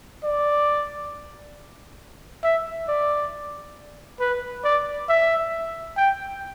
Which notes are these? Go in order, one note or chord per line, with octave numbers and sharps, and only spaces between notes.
D5
E5
D5
B4
D5
E5
G5